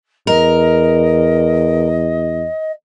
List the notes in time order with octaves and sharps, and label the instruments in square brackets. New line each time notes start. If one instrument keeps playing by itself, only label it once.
[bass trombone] E2 [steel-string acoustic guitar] A#4 [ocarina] D#5